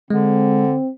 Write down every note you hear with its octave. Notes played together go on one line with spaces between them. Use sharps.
D3 G#3 C4